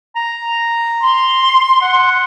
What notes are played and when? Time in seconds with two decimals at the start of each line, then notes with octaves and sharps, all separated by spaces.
0.16 A#5
1.01 C6
1.82 F#5